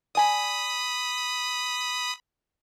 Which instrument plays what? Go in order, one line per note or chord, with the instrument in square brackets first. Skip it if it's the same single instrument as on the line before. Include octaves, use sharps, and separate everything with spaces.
[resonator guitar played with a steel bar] D5 G#5 [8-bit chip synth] B5 D#6